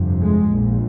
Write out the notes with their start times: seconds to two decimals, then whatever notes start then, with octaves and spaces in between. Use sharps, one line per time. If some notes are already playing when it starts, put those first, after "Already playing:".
Already playing: G1 F2 C3
0.21 G#3
0.49 A#1 A#2